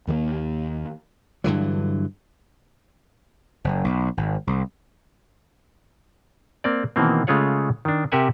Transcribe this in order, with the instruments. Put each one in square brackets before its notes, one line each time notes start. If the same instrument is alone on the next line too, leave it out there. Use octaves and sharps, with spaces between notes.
[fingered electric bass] D#2 D#3 G3 A#3
[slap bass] G2 D3 E3 F#3
F#1
B1
G#1
C2
[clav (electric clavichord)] A#3 C4 D5
B2 D#3 E3 A#3 C4
C#3 G#3 A3 F4 C#5 F#5
D#3 D4
C3 G4 A#4 E5 F#5 G#5